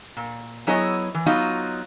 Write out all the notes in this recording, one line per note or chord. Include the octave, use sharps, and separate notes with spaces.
A#2
F#3 B3 E4 G#4 C#5 D#5
E3
F#3 B3 D#4 F4 F#4 D#5